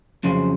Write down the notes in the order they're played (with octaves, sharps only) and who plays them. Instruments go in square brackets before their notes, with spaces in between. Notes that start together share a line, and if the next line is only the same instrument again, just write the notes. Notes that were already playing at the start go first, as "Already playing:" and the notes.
[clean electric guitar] F2 C#3 F#3 C5